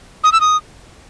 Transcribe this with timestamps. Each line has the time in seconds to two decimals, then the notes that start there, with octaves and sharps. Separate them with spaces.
0.24 D#6
0.32 E6
0.41 D#6